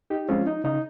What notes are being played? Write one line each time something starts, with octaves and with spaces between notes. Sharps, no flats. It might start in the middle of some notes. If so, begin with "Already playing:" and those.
D#4 G4
F3 G#3 C4 C#4 F4
D#4
C#3 D#4